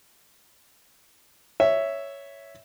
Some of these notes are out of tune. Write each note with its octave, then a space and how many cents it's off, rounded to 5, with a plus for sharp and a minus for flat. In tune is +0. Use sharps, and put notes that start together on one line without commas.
C#5 +5 E5 +0